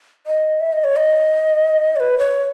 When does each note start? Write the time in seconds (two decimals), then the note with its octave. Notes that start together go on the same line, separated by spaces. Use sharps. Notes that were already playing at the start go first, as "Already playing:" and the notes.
0.27 D#5
0.61 E5
0.72 D#5
0.84 C#5
0.96 D#5
1.96 C#5
2.00 B4
2.18 C#5